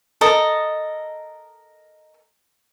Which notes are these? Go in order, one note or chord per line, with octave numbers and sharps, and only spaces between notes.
A4 A#4 D#5